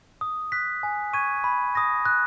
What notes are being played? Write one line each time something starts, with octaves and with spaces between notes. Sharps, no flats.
D#6
F#6 B6
G#5
C#6 G#6 D#7
B5
D#6 A#6
F#6